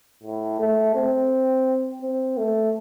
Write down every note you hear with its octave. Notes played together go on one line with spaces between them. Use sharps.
A2
A3
C4
C4
A3